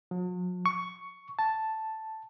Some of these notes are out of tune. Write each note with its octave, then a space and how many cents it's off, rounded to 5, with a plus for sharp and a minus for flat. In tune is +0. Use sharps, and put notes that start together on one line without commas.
F#3 -45
C#6 +10
A5 +0